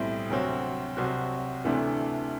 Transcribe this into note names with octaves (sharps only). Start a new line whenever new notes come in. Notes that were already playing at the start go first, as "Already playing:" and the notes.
Already playing: B1 A2 G3 C4 E4
D2 C3 F#3 C4 F#4
C2 C3 F#3 C4 F#4
D2 C3 E3 A3 D4